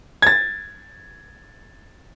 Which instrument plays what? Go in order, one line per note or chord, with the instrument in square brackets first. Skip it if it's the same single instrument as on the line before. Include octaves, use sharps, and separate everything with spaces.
[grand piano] G#6 A6